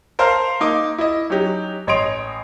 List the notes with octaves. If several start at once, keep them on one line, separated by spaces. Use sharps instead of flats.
A#4 C5 F5 A5 A#5 F6
A#3 D#4 D6
E4 D#5
F#3 C#4 D#4 G4
A1 C#5 D#5 C6 D7 F7